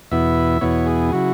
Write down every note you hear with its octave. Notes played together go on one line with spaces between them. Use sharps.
E2 B2 B3 E4 E5
E2 B2 B3 E4 C#5
G#4
C#3 F#3 E4 F#4